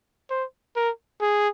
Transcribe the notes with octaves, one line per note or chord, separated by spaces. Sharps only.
C5
A#4
G#4